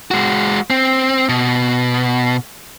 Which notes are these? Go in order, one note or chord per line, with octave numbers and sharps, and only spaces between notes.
G#3 F#4
C4
B2